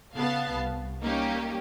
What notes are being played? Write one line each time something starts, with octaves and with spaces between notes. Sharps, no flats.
C#3 B3 F5 A5
C2
G3 A#3 C#4 D#4 G4